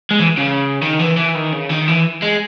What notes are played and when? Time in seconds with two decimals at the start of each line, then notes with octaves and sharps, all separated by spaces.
0.11 G#3
0.20 E3
0.37 C#3
0.82 D#3
0.99 E3
1.17 E3
1.35 D#3
1.52 C#3
1.69 D#3
1.87 E3
2.22 G#3